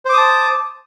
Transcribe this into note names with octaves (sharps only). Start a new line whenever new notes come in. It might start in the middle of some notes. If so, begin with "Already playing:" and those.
C5 A5 D6 D#6